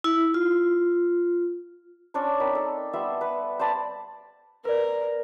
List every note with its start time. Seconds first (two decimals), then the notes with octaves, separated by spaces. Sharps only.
0.04 E4
0.34 F4
2.14 C#4 D4 C5 C#5
2.40 C4 D#4 A#4 B5
2.55 A4
2.93 G3 B3 C5 E5
3.21 B4
3.59 C5 D5 A5 B5
4.65 A#4 B4 D5